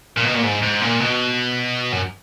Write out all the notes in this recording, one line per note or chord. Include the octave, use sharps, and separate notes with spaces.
A#2
B2
A#2
G#2
G#2
A#2
B2
F#2